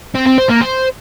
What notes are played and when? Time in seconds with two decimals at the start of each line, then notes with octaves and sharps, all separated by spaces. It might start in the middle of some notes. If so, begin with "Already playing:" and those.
0.15 C4
0.26 C4
0.38 C5
0.49 A#3
0.61 C5